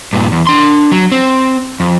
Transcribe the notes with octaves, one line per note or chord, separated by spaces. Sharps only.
G2 A#2
E2
D4 C6
F#3
C4
F2